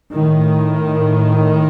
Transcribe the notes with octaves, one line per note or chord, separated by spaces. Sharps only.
A2 D#3